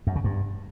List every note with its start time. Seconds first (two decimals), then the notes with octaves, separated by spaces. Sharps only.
0.07 F#2
0.16 C#3
0.24 G2